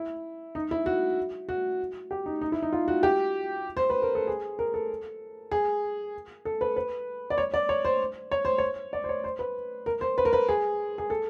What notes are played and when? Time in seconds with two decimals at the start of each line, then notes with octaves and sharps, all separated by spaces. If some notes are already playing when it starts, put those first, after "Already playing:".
Already playing: E4
0.55 D#4
0.71 E4
0.86 F#4
1.49 F#4
2.11 G4
2.26 D#4
2.41 D#4
2.52 E4
2.62 D#4
2.73 F4
2.88 F#4
3.03 G4
3.77 C5
3.90 B4
4.02 A#4
4.15 A4
4.27 G#4
4.59 A#4
4.74 A4
5.51 G#4
6.45 A4
6.61 B4
6.76 B4
7.30 D5
7.38 C#5
7.54 D5
7.69 C#5
7.85 C5
8.31 C#5
8.45 C5
8.58 C#5
8.93 D5
9.04 C5
9.09 C#5
9.24 C5
9.39 B4
9.86 A#4
10.01 C5
10.18 B4
10.25 A#4
10.33 B4
10.49 G#4
10.98 G#4
11.10 A4